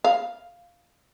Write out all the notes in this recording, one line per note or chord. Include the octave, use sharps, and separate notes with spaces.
F5